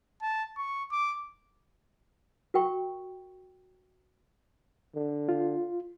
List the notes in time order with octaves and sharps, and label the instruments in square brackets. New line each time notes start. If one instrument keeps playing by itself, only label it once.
[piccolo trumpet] A5
C#6
D6
[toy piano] F#4 A#4 G5 C#6
[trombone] D3
[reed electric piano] F4